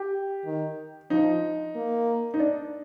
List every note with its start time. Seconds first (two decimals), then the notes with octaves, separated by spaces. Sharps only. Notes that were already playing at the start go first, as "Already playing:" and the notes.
Already playing: G4
0.46 D#3
1.10 F3 D#4
1.75 A#3
2.34 D#4
2.40 D4